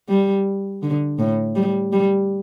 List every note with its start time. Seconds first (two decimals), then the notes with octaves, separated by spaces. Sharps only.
0.10 G3
0.82 D3
1.19 A2
1.56 G3
1.93 G3